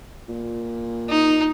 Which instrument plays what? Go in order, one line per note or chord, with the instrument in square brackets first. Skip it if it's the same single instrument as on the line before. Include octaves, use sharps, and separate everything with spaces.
[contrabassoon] A#2
[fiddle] D#4